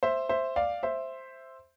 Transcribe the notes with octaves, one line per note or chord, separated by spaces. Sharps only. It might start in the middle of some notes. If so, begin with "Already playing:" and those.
C5 E5
C5 E5
D5 F5
C5 E5